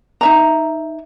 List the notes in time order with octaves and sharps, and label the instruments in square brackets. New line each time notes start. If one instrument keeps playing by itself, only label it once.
[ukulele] D#4 E5 A#5